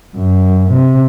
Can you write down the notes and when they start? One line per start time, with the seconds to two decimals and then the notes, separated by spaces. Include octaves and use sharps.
0.17 F#2
0.73 C3